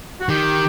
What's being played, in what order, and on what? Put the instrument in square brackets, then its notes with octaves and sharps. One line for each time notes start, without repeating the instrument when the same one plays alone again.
[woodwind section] F#4
[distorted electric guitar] D#3 [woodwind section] G4